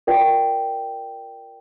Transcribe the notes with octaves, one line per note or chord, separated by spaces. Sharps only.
F4 A#4 D5 G5